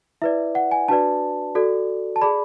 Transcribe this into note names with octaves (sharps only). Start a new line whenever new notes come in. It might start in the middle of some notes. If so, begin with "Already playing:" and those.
E4 B4 D5 E5
F#5
G#5
D4 F#4 B4 D5 A5
F#4 A4 D5
A5
G#4 D5 B5